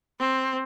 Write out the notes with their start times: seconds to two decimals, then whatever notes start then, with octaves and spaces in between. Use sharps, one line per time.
0.20 C4